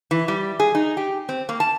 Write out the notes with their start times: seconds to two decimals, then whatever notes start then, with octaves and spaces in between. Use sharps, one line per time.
0.11 E3
0.28 G3
0.60 G#4
0.75 D#4
0.97 G4
1.29 C4
1.49 A#3
1.60 A5